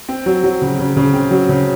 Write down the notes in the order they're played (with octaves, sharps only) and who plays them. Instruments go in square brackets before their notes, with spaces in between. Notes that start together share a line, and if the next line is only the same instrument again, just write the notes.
[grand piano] C4
F#3
F#3
C#3
C#3
C#3
C4
F#3
C#3